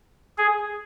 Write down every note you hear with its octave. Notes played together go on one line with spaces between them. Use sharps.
G#4